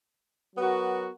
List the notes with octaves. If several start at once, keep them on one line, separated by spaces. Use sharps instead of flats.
F#3 B3 F#4 A#4